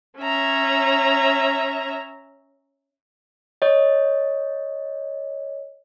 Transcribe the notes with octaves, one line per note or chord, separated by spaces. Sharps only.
C#4 E5 A#5
C#5 D#5